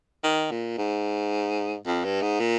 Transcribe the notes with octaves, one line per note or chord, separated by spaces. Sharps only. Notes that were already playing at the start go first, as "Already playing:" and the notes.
D#3
A#2
G#2
F2
G2
G#2
A#2